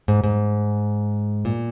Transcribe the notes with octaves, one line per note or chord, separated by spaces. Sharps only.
G#2
G#2
A#2